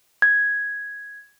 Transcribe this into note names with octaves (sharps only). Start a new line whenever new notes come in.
G#6